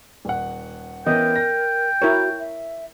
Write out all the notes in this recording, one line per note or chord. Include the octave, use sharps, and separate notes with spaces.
D#1 F#5
E3 B3 C#4 A#4 D#5 G5
A#6
E4 F#4 A#4 C#5
E5